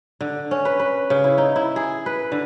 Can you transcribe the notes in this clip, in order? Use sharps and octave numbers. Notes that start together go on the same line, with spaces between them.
D3
C#4
B4
B4
C#3
E4
D#4
E4
G#4
B4
D3